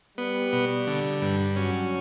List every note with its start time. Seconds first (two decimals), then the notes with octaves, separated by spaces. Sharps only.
0.18 G3 B3
0.53 B2
0.87 D3
1.22 G2
1.56 F#3 C#4